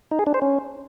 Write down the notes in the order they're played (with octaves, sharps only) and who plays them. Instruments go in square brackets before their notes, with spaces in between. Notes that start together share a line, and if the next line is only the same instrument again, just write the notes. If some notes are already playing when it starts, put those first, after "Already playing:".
[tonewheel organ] D#4
G#4
D4
C5
C#4